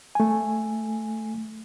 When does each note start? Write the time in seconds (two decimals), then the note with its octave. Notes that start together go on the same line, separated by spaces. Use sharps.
0.15 A3 G#5